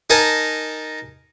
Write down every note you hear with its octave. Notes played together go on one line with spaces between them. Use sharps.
D#4 A#4 G#5 A5